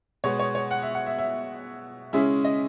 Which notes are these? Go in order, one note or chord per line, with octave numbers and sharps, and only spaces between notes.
B2 G#3 B3 C#5
C#5
C#5
F#5
E5
F#5
E5
E5
C#3 G#3 C#4 E4 E5
D#5